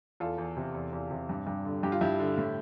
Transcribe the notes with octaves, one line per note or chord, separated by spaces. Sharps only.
E2 F4 A4
E2
C3
E2
E2
C3
G2
G2
D3
G2 G4
F4
G2 E4 G4
D3
A2